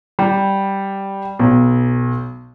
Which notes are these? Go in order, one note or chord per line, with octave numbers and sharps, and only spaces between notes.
G3
B1